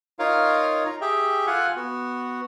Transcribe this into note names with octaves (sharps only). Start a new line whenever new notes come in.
D#4 F4 A#4 C#5 F5
A#5
G4 G#4 E5 G5
F4 A4 F5 F#5 G#5 F#6
B3 F#4